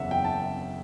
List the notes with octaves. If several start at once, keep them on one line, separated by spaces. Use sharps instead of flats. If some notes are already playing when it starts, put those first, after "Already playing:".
Already playing: F#1 E2 C#3 E5 F#5
G5
A5